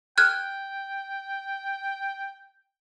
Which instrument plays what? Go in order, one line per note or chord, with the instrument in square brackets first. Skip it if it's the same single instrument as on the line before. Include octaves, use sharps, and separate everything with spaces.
[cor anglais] G5 [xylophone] F6 F#6 G#6